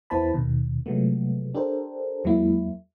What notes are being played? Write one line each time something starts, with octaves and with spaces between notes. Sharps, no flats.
E2 B3 E4 C5 A5 B5
D#2 B2 D#3
C3 F3 F#3 G#3 A3 B3
D4 G4 A4 A#4 C5
E2 F#3 G#3 A#3 E4